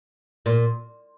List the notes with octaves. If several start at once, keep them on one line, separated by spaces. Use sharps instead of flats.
A#2